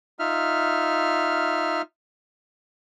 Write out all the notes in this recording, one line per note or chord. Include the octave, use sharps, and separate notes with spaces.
D#4 F4 E5 F6